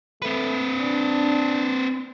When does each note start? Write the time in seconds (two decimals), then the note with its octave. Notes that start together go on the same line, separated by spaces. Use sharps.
0.22 A3 C4 B4
0.78 D4